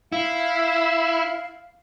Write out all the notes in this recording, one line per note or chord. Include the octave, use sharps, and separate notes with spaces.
E4 F5